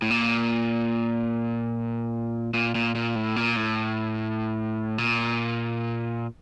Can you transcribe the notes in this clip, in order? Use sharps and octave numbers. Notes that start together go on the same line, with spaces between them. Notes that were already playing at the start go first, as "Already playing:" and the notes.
A2
A#2
A#2
A#2
A#2
A2
A#2
A2
A#2